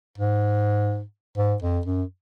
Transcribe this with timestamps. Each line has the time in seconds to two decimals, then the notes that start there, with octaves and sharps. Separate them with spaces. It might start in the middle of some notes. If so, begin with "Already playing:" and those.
0.18 G#2
1.38 G#2
1.62 F2
1.86 F#2